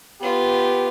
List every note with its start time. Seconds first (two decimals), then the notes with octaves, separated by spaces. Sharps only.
0.21 B3 F4 G4